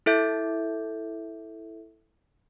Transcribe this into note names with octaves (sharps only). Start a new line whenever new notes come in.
E4 A4 E5 G6